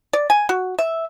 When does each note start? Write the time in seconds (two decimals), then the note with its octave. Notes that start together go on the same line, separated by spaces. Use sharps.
0.13 D5
0.30 G#5
0.49 F#4
0.79 E5